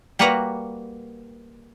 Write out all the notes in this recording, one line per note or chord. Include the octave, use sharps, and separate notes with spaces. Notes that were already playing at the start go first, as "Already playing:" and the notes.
G3 A#3 F#4 B4 F#5 A#5